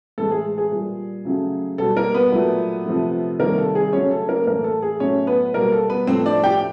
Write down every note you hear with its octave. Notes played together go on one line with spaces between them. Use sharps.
A2 E3 G#3 A4
G#4
G#4
A#2 G3
C#3 F#3 A3
B2 G3 A4
A#3 A#4
B3 B4
A#2 F#3 A3
C3 F3 A3
C3 D#3 G3 A#3 A#4
A4
G#4
C#3 F#3 A3 C#4 C#5
A4
A#3 A#4
A2 E3 A3 A#3 A#4
A4
G#4
A2 F#3 A3 C#4 C#5
B3 B4
B2 G3 A#3 A#4
A4
B3 B4
A2 F3 A3 C4 C5
D4 D5
G4 G5